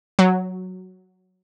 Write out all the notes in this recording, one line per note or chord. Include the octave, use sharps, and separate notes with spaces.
F#3